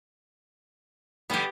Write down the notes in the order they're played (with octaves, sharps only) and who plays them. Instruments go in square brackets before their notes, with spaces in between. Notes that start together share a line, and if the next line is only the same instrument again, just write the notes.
[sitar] G2 D3 G3 [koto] B3 G4